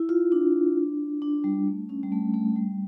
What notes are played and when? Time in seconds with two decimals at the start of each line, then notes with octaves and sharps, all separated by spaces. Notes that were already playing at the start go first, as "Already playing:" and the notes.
Already playing: E4
0.09 F4
0.32 D4
1.22 D4
1.44 G3
1.67 A3
1.89 C#4
2.03 G3
2.12 A3
2.34 A3
2.56 G3